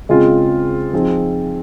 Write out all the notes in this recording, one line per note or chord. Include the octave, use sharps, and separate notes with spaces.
C#3 G#3 C4 F4
F3 C4 D#4 G#4